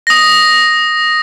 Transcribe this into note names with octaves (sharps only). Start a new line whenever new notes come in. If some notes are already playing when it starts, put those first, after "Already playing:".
D#6 A#6